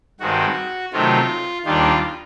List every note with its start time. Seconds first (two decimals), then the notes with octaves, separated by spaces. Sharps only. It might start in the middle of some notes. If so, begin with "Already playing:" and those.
0.20 G2 D#3 G#3 C4 F#4
0.93 C3 D#3 F#3 A3 F4
1.65 D#2 D#3 G3 A#3 D4 F4